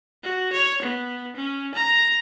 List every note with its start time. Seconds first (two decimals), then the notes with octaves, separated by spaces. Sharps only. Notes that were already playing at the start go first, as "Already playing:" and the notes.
0.23 F#4
0.53 C#5
0.82 B3
1.36 C#4
1.74 A#5